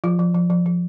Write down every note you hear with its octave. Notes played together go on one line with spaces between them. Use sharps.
F3 F4
F3
F3
F3
F3